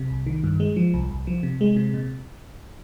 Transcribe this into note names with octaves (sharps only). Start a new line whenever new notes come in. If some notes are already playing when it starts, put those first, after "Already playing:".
Already playing: C3
C2
D#3
G2
G#3
F3
C2
C2
F3
C3
G#3
C3
A#2